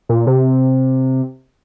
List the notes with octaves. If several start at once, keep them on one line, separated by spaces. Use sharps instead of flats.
A#2
C3